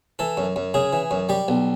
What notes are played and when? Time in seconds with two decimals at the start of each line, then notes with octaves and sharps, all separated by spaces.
0.19 E3 A4
0.37 F#2
0.56 F#2
0.74 C#3 G#4
0.93 E3
1.11 F#2
1.29 G3 G4
1.48 B1